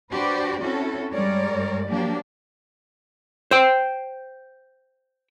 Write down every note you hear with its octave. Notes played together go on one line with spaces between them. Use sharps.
D4 F#4 G4 B4 C5 D5
C4 C#4 E4 F#4 A4
G2 G3 G#3 A#4 C#5 D5
F3 F#3 A#3 D4 G4
C5 G5